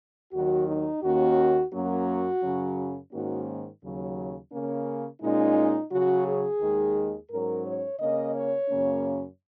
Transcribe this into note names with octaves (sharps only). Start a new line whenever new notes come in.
D#2 D#3 F#3 F#4
D#4
D#2 D#3 A#3 C#4 F#4
F#2 F#3 A#3 C#4 F#4
F#2 C#3 F#3 C#4
G#2 D#3 A#3 C#4 F#4
D#2 C#3 F#3
C#3 A#3 C#4
A#2 G#3 C#4 D#4
C#3 F#3 C#4 F#4
G#4
D#2 D#3 G#3
G#2 F#3 C#4 A#4
C#5
C#3 A#3 C#4 D#5
C#5
F#2 C#3 A#3 C#4